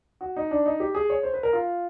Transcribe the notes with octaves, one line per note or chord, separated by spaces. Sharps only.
F#4
D#4
D4
D#4
G4
G#4
C#5
C5
B4
A#4
F4